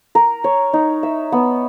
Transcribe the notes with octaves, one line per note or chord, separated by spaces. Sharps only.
A#4
C#5
D#4
E5
B3